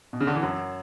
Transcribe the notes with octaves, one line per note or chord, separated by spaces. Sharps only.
B2
C#3
D3
E3
F#2 F#3